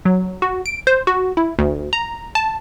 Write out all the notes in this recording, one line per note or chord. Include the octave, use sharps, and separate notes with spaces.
F#3
F#4
D7
C5
F#4
E4
D2
A#5
A5